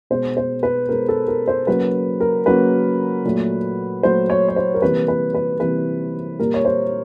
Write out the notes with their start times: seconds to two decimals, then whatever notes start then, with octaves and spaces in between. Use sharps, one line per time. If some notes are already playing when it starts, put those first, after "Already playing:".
0.10 B2 G#3 C5
0.37 C5
0.63 B4
0.89 B2 G#3 A#4
1.09 A4
1.28 A#4
1.48 C5
1.67 C#3 F#3 A#3 B4
2.20 A#4
2.46 C#3 F#3 A#3 B4
3.25 A#2 F#3 A3
4.03 A#2 F#3 A3 C5
4.30 C#5
4.48 C#5
4.56 C5
4.74 A#4
4.82 C3 E3 G3 A#3 B4
5.08 B4
5.35 B4
5.60 C3 E3 G3 A#3 B4
6.39 A#2 G3 A#3 A#4
6.54 C#5
6.65 C5